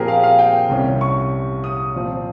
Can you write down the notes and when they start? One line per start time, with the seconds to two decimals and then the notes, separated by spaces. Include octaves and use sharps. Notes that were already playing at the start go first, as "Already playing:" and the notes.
Already playing: A#2 F3 C4 G4 G#4 A#4
0.08 F5
0.24 F5
0.39 G5
0.70 C2 C3 G3 C#4
1.01 C#6
1.64 D#6
1.95 A#2 F3 C4